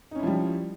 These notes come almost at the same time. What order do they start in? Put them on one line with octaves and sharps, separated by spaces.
D#4 C#4 E4 F3 G3